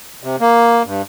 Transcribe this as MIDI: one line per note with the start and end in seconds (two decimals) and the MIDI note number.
0.23 0.36 48
0.41 0.83 58
0.85 1.02 43